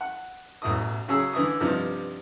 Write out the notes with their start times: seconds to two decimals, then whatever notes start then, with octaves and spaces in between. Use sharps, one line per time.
0.01 F#5
0.62 A1 B2 F#3 E4 D#6
1.08 C#3 F#3 C#4 G#4 E6
1.33 D3 E3 E4 D#6
1.60 G2 C3 F3 G3 B3 D#4